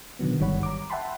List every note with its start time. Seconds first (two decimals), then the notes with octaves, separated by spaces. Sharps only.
0.19 B2 D3 D#3 F#3 B3
0.40 G1 D#3 G3 C#5 F#5 B5
0.63 A#5 D6
0.90 E5 F#5 G5 A5 B5 C6